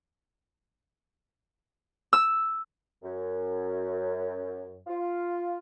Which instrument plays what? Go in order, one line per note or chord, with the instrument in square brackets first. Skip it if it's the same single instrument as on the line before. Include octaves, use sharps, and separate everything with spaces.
[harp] E6
[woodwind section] F#2
F4